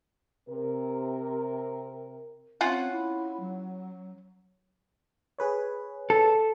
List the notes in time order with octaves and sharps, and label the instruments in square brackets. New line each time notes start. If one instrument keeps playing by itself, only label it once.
[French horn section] C3 A#4
[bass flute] C4 [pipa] C#4 F4 F#5
[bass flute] E4
F#3
[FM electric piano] G#4 B4 C#5
[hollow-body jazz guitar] A4